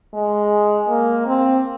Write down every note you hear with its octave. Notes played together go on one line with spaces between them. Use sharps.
G#3
A#3
C4